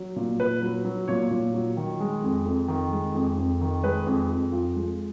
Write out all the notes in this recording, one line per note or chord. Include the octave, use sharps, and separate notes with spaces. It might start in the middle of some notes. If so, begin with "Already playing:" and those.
Already playing: F#3
A#2
A#2 B4
F#3
F#3
A#2 C#5
A#2
F#3
D#3
G#3
F2
F2
D#3
G#3
F2
F2
D#3
G#3 B4
F2
F2
F3
G#3